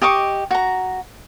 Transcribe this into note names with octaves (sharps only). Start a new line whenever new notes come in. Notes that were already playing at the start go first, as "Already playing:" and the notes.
G4 D#5 C#6 D6
F#4 A#5